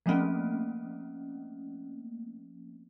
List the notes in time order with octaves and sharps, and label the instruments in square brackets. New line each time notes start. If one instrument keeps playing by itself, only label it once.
[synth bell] F3 A3 A#3 C4 C#4